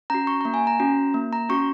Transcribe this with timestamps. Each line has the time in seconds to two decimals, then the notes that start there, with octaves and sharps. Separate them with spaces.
0.10 C#4 F#4 A#5
0.27 C#6
0.41 A#3 A#5
0.54 G#5
0.67 A#5
0.80 C#4 F#4
1.14 A#3
1.33 A#5
1.49 C#4 F#4 C#6